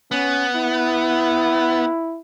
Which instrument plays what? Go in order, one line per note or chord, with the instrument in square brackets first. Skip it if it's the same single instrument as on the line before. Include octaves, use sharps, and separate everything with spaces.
[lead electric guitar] B3 [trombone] C#4
[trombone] E4